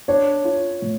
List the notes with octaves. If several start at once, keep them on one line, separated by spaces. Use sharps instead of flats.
D4 C#5
F4
A2